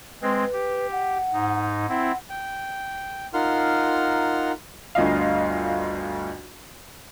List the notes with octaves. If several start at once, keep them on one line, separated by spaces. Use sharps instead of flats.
G#3 C4 B4
G4
F#5
G#2 D#4
C4 E4 F#5
G5
D#4 F4 A#4 F#5 C6 F6
G1 D2 F4 D#5 F5